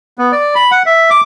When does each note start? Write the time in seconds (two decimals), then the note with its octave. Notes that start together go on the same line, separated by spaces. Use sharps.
0.18 B3
0.32 D5
0.55 B5
0.71 F#5
0.86 E5
1.10 D6